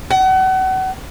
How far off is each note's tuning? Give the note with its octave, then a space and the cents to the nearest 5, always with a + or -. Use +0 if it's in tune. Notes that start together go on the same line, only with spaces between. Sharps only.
F#5 +35